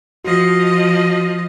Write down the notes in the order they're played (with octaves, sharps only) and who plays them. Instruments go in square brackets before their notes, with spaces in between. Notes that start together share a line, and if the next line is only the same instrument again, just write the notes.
[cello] F3 D#5 [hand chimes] F#4